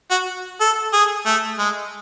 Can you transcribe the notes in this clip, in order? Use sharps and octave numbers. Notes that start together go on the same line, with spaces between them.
F#4
A4
G#4
A3
G#3